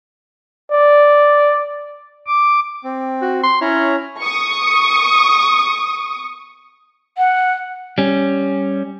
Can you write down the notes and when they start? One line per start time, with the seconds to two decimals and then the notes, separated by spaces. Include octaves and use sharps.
0.71 D5
2.27 D6
2.84 C4
3.22 F#4
3.43 C6
3.61 C#4 E4 C#5 A#5
4.22 C#6 D#6
7.18 F#5
7.98 G3 C#4